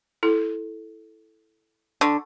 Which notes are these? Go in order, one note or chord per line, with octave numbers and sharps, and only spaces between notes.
E4 A4
D3 C#6